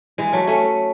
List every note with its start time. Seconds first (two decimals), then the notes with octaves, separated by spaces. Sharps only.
0.18 E3 G#3
0.33 F#3 A3
0.47 A3 C#4